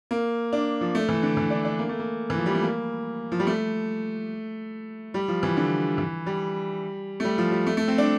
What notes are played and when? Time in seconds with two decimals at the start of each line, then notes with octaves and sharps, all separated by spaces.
0.11 A#3
0.53 D4
0.81 F3
0.95 A3
1.09 E3
1.23 D3
1.37 E3
1.50 D4
1.65 D4
1.79 A#3
1.89 A3
1.99 A#3
2.30 E3
2.38 F3
2.46 G3
2.55 A3
2.63 A#3
3.32 F3
3.39 G3
3.47 A3
5.14 G3
5.28 F3
5.43 E3
5.57 D3
5.98 E3
6.26 G3
7.20 A3
7.24 G3
7.38 F3
7.52 G3
7.67 A3
7.77 A3
7.88 C4
7.98 D4